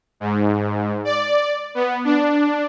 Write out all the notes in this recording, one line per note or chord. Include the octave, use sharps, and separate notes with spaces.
G#2
D5
B3
D4